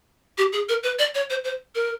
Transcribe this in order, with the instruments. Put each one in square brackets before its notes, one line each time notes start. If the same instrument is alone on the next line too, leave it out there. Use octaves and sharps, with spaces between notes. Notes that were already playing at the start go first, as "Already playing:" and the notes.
[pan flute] G4
G#4
A#4
B4
D5
C#5
C5
C5
A#4